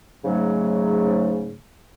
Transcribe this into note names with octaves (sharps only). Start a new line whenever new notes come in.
G#2 C#3 F#3 A3